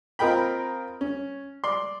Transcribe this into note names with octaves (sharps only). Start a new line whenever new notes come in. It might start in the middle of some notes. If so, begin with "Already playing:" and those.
C4 F4 A#4 D#5 G5 B5
C#4
D5 C6